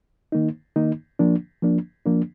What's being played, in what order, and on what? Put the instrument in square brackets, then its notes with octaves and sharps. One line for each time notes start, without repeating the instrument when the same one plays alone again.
[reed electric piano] D#3 A#3 D#4
D#3 A#3 D#4
F3 A#3 D4
F3 A#3 D4
F3 A#3 D4